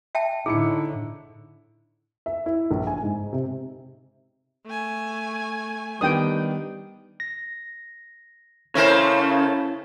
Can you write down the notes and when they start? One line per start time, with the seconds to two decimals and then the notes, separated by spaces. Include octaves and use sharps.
0.15 E5 G5 A5
0.46 A2 D3 D#4 E4 G#4 C#7
2.26 E5
2.46 E4
2.71 A#1
2.87 G#5
3.03 G#2
3.33 C3
4.66 A3 G#5
6.01 D#3 G3 B3 D4 G5 D#6
7.20 A#6
8.75 C#3 A3 C#4 E4 A#4 C5 C#5